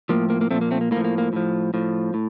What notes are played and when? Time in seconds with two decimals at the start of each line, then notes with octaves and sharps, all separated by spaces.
0.09 A2 F3 A#3
0.30 A#3
0.41 A#3
0.51 A#2 F3 A3 C4
0.61 A#3
0.71 A3 C4
0.81 A#3
0.91 A2 A#3
0.96 F3
1.04 A#3
1.18 A#3
1.33 A2 F3
1.74 A2 F3
2.14 A2